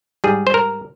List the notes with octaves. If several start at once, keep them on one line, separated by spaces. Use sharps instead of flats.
G#2 G3 G#4
C5
A#4